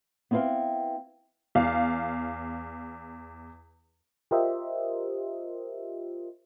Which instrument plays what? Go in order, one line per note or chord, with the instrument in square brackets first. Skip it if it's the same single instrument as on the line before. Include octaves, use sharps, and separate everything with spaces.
[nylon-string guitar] B3 C4 E4 B4 F5 G5
[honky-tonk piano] E2 F5
[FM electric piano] F4 G4 A#4 C5 D#5 E5